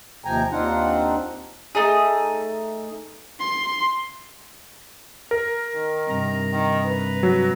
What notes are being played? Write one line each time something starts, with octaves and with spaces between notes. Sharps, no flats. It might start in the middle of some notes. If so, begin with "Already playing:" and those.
D#2 C3 F3 G5 G#5 A#5
D#2 C4 D4 D#4 F4 F#5
A3 D#4 G#4
C6
A#4
D#3
G2 C3 A#5
D#3
B4
F#3